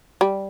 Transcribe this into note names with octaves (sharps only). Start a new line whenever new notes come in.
G3